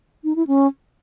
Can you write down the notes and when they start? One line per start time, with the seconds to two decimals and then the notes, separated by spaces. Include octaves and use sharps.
0.24 D#4
0.36 E4
0.47 C#4